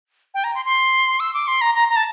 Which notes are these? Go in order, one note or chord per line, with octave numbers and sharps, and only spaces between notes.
G5
A#5
C6
C6
E6
D6
C6
A#5
A#5
A#5
A5